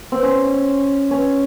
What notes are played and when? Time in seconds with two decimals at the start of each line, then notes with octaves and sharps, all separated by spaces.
0.12 C4
0.23 C#4
1.11 C#4